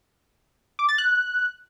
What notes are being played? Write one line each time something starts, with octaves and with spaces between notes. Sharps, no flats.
D6
A6
F#6